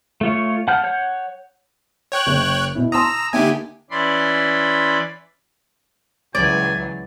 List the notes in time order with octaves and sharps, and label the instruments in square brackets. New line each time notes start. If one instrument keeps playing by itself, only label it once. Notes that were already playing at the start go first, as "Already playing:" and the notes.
[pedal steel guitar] A3 F4 C#5
F#5 A5 F6 G6
C#5 F#5 G6
[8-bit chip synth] C#5 G5 F#6
[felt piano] F#1
B2 E4
[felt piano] A5 C6 D#6 [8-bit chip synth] A#5 E6
[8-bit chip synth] D3 G4 G#5 [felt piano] A#3 D#4 E5
[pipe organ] E3 C#4 D5 B5 C6
[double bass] C#2 E3 [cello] F#3 [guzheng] D5 [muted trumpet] G#5